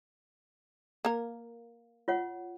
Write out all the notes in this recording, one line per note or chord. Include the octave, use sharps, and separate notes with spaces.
A#3 A#4
F4 C#5 F#5